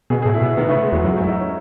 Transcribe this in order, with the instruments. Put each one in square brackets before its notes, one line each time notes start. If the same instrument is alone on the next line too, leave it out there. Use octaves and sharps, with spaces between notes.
[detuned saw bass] B2 [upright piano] G#4
[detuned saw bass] A2 [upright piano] G#4
[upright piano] E4
[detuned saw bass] B2
[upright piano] E4
[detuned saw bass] D#3 [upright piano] B3
[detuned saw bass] C#3 [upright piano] A3
[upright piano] G#3
[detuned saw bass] E2 [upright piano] F#3
[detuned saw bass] F#2 [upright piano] F#3
[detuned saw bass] G#2 [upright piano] A3
[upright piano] E4
[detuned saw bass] G#2 [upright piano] D#4
[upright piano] C#4